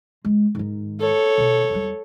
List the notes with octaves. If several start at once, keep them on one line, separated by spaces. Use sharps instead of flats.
G#3
G#2 D#3
A4 C#5
B2 D#3
E2 G3